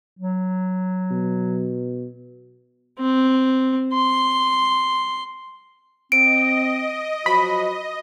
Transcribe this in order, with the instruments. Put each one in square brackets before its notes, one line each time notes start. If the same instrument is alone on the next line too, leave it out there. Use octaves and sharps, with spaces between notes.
[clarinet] F#3
[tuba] B2
[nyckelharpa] C4
C6
[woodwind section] C4 [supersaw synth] D#5 [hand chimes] D7
[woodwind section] F3 F#3 F#4 [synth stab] B5